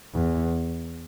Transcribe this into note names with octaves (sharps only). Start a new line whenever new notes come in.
E2